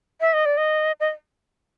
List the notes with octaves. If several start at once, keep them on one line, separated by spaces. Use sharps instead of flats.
E5
D#5
D5
D#5
D#5